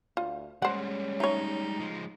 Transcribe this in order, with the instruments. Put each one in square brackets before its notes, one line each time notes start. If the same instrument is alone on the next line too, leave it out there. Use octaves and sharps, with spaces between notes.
[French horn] D2 [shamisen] F4
[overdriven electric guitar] G3 G#3 [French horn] C#4 [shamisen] C5 F#5
[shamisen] A3 C#5 [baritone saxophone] D#4
[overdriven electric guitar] F3 G#3